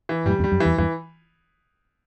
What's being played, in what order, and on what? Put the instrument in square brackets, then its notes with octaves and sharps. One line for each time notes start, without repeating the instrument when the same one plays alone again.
[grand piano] E3
[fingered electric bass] F#2 A2 [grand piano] G3
[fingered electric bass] E2 G2
[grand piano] G3
[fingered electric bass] F#2
[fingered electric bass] E2 [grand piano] E3
[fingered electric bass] E2 G2 [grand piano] E3